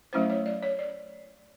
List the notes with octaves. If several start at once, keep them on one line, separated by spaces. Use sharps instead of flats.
F#3 A3 C#4 E4 C5
C#5
D5
C#5
D5